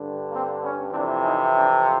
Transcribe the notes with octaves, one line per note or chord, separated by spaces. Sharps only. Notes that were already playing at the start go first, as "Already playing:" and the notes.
Already playing: G2 D3
A#3 C4
B3 C#4
F2 C3 E3 C4 D4
C#4 D#4
C4 D4